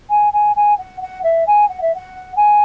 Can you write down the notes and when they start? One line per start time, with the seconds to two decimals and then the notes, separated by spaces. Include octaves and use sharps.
0.10 G#5
0.33 G#5
0.56 G#5
0.78 F#5
1.01 F#5
1.23 E5
1.47 G#5
1.68 F#5
1.81 E5
1.94 F#5
2.36 G#5